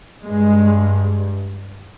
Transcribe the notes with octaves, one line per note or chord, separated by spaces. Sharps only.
G2 G#3